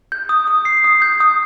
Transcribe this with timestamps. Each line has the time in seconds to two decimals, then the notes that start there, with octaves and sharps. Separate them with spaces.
0.12 G6
0.29 D#6
0.47 D#6
0.65 C7
0.84 D#6
1.02 G6
1.20 D#6